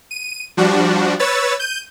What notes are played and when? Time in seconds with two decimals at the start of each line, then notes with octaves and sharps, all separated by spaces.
0.11 D#7
0.57 F3 G3 D4 F#4
1.19 B4 C#5 E6 A6
1.59 G6 D#7